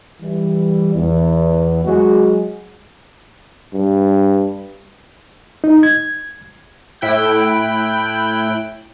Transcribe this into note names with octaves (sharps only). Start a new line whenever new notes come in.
E3 G3
E2
F#3 G#3 F#4 G#4
G2
D#4
G#6
A2 E4 G5 F#6 G6